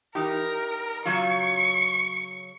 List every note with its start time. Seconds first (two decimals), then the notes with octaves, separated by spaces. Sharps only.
0.15 E3 D#4 G4 A#4
1.05 C#3 F#3 F4 C#6